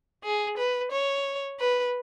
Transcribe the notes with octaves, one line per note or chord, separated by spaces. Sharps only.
G#4
B4
C#5
B4